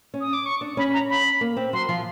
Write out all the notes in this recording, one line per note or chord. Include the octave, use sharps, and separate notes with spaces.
C#4
D#6
D6
C#6
D4
C#4 B5
A#5
B5
A#3
C4
F#3 C6
F3